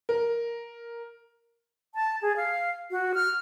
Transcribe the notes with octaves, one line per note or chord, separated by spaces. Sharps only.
A#4
A5
G#4
F5
F#4
F6